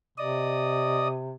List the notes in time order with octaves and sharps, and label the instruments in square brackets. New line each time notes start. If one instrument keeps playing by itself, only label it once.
[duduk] C3 [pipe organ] D5 D#5 D#6